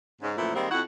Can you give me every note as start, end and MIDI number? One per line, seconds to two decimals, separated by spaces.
0.22 0.36 44
0.22 0.36 49
0.37 0.52 42
0.37 0.52 46
0.37 0.52 52
0.37 0.52 53
0.37 0.52 57
0.37 0.52 64
0.55 0.68 51
0.55 0.68 55
0.55 0.68 56
0.55 0.68 58
0.55 0.68 60
0.71 0.82 41
0.71 0.82 64
0.71 0.82 66
0.71 0.82 78